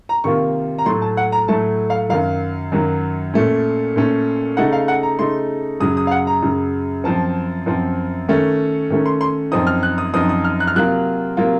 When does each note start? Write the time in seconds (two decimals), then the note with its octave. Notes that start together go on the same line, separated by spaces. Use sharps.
0.09 A#5
0.24 C3 D#3 A#3 F4 C#6
0.78 A#5
0.86 A2 F#3 A3 C6
1.02 A5
1.17 F#5
1.32 A#5
1.48 A2 F#3 A3 A5
1.90 F5
2.10 F#2 D#3 F#3 F5
2.72 F#2 D#3 F#3
3.34 A#2 A3 C#4
3.96 A#2 A3 C#4
4.57 C#3 A3 D#4 F#5
4.73 F5
4.88 F#5
5.03 A#5
5.19 C#3 A3 D#4 C6
5.80 F#2 C#3 F#3 D#6
5.97 D#6
6.07 F5
6.11 F#5
6.27 A#5
6.43 F#2 C#3 F#3
7.04 F#2 F3 C4 A5
7.66 F#2 F3 C4
8.29 D#3 A3 C#4
8.90 D#3 A3 C#4
9.06 C6
9.21 C6
9.51 F#2 F3 C4 D#4 D#6
9.67 F6
9.83 F#6
9.98 D#6
10.14 F#2 F3 C4 D#4 D#6
10.29 D#6
10.44 F6
10.60 F#6
10.67 F6
10.76 C3 F#3 A#3 F4 F#6
11.37 C3 F#3 A#3 F4